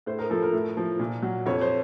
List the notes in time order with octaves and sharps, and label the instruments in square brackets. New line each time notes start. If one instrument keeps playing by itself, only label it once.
[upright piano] A2 C5
A#4
F3 A4
A#4
A2
F3
A#2
F#3
F2 C#5
C5